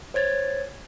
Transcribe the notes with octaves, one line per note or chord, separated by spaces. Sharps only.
C5 C#5 G#6 A6